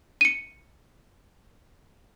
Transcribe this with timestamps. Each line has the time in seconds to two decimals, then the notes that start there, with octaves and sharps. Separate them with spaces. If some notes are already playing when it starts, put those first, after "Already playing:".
0.21 C#7 D#7